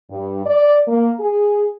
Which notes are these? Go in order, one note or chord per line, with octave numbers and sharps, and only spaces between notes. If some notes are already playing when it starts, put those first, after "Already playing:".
G2
D5
A#3
G#4